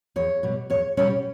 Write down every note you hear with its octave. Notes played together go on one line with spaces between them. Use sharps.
E2 C#5
B2 G3
E2 C#5
B2 G3 C#4 C#5